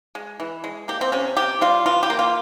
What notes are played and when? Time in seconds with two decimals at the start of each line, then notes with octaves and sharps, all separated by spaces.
0.15 G#3
0.40 E3
0.64 G#3
0.88 A#3 G4
1.01 C4
1.12 C3 C#4
1.37 C3 G4
1.61 G3 F4
1.86 E3 F4
2.03 G4
2.10 A#3
2.19 F4